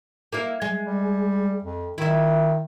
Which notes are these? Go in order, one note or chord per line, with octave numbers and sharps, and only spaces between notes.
A#3 E4 F5
G#3
G3
F2
D#3 E4 E5